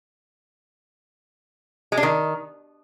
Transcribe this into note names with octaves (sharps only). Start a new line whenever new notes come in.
G#3
D4
D#3